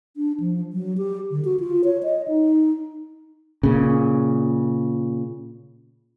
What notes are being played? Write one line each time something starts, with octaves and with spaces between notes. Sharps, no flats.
D4
F3
F#3
G4
D3
F#4
F4
C#5
D#5
D#4
A#2 C#3